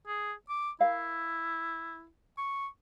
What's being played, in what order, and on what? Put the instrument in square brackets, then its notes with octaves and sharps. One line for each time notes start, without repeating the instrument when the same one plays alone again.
[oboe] G#4
D6
[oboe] E4 [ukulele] A#4 F5
[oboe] C#6